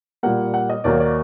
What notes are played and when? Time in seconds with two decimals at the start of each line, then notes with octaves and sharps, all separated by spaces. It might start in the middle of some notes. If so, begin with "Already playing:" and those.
0.23 A#2 G3 A#3 F#5
0.54 F#5
0.70 D#5
0.84 D#2 D#3 F#3 A#3 D5
1.00 D5